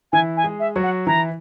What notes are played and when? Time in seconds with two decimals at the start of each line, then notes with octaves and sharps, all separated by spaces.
0.12 E3 E4 G#5
0.37 G#5
0.44 G#3 G#4
0.60 E5
0.76 F#3 F#4
0.83 F#5
1.07 E3 E4 A#5